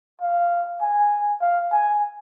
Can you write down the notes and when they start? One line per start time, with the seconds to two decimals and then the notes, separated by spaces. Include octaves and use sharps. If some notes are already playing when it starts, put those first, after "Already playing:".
0.21 F5
0.81 G#5
1.41 F5
1.71 G#5